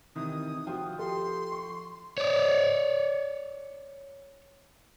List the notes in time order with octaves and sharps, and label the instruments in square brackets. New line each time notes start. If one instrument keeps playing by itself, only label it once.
[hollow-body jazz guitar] C3 D#3 E3 [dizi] D#6
[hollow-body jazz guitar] F3 [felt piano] F#4 G5
[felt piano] G4 A4 G5 [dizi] C6
[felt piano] C#6
[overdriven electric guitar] C#5 D5